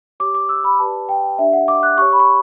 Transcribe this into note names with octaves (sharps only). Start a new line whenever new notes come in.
G4 C#5 D6
D6
E6
B5
G4 B4 D5 A5
G5
D4 G4 D5 E5
F#5
D6
F#6
G4 C#5 C#6
B5
C#6